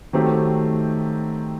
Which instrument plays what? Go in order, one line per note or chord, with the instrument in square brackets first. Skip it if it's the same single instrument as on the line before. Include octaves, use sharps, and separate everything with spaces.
[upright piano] D#3 F#3 A3 C4 G4